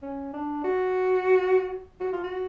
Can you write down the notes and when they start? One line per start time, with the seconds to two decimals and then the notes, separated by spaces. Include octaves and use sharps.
0.02 C#4
0.33 D4
0.64 F#4
2.01 F#4
2.13 F4
2.23 F#4